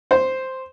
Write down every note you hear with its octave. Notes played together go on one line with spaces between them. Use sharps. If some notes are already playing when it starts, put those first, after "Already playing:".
C5